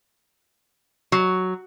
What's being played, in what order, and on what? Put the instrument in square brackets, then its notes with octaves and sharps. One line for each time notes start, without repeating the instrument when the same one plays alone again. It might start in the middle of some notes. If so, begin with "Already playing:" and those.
[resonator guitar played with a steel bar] F#3